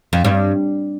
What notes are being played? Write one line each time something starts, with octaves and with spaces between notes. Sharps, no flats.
F2
G2